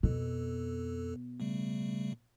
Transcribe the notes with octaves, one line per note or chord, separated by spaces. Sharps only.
F2 B2 A4
C#3 G3 A3